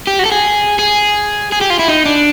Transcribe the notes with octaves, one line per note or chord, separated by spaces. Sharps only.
G4
F#4
A4
G#4
G#4
G#4
G4
F4
E4
D#4
D4